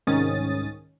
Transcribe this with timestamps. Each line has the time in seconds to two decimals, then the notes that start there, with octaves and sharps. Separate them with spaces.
0.07 C2 G#2 D#3 C#4 D#6 A6